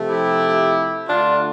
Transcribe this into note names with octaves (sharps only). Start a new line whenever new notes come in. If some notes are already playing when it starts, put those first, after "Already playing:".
Already playing: C3 F3 A3
E4 G4
D3 A3 D4 F4